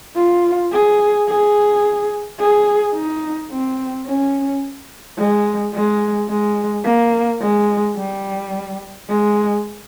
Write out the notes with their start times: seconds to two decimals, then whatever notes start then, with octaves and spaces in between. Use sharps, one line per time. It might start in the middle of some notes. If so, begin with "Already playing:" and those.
0.16 F4
0.72 G#4
1.28 G#4
2.40 G#4
2.95 D#4
3.51 C4
4.07 C#4
5.19 G#3
5.74 G#3
6.29 G#3
6.85 A#3
7.41 G#3
7.97 G3
9.09 G#3